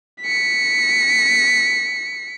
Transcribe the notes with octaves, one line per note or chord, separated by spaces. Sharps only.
B6 C#7